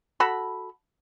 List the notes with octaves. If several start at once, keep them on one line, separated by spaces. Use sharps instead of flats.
F#4 A4 B5